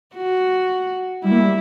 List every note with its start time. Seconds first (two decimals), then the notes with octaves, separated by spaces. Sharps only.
0.15 F#4
1.24 G3 E4
1.32 A#3
1.40 G3